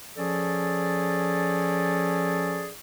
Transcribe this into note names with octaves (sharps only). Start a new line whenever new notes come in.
F3 C#4 G#4 A4 D5